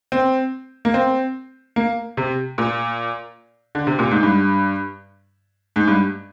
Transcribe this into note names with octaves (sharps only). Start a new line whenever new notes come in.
C4
A#3
C4
A#3
C3
A#2
D3
C3
A#2
G#2
G2
G#2
G2